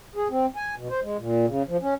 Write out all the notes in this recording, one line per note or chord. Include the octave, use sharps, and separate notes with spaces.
G#4
C4
G#5
B2
C5
G#3
A#2
C#3
F3
C#4